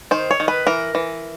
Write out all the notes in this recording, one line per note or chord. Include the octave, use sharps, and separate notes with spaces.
D#3 C5
C#5
D#3
B4
E3 A#4
E3